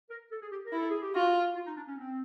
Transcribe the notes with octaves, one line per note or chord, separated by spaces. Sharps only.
A#4
A4
G#4
G4
A#4
E4
A4
G#4
G4
F4 F#4
F4
D#4
D4
C#4
C4